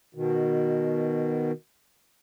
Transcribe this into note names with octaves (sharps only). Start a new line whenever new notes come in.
B2 D#3